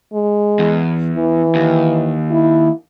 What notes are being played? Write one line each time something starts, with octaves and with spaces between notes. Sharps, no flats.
G#3
E2
E3
D#2
E4